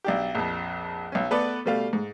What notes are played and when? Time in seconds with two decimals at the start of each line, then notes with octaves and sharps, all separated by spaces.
0.04 B1 D4 G4
0.35 A#1 F2
1.12 B1 C#4
1.31 A3 B3 A4 B4 D5
1.66 B2 G3 A3 F5
1.93 G#2